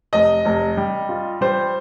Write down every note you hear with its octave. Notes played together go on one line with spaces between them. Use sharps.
F1 D#5
F1
G3
F4
G3 C5